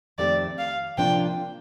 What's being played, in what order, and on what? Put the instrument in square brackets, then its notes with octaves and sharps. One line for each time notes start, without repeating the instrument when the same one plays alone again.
[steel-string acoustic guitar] F2 D#3 A3 C4 G4 [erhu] D5
[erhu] F5
[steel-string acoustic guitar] C3 F3 A#3 D4 F4 [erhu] G5